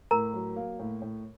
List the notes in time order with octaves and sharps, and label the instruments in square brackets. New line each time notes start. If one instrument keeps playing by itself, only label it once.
[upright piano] A2 [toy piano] A#4 A#5
[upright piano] F#3
A#3
A2
A2